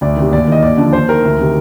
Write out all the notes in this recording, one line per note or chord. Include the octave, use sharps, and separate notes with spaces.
D2 D5
C3 D#3
D#2 D5
D#3 D#5
D#2 D5
D3 F3
D#2 C5
D#3 A#4
D2
C3 D#3